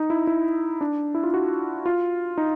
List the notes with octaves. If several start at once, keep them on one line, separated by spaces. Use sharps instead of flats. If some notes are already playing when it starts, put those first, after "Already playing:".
Already playing: D#4
E4
E4
D4
E4
F4
F#4
F4
D#4